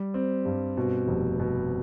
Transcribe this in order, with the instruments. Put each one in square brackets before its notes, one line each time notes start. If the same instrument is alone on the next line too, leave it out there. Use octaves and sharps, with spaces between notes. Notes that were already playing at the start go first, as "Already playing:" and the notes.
Already playing: [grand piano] G3
C4
G2
B2
F1
B2